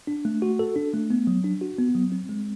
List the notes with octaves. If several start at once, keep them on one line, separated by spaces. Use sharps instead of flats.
D4
A3
F#4
A4
D4
A3
B3
F#3
D4
F#4
B3
F#3
C4
G#3